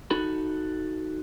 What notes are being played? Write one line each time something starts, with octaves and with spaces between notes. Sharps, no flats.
D#4 F#4 A4 B5